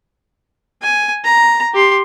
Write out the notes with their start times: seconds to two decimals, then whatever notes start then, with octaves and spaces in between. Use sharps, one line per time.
0.82 G#5
1.24 A#5
1.74 G4 C6